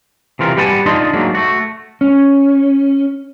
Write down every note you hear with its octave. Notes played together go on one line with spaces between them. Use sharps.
C3 E3 F4 A#4
G3 G4 B4 F#5 G#5 A5
D4 D#4 F4 D#5 A5 C6
G#2 F#3 A#3 D4
A3 F#4
C#4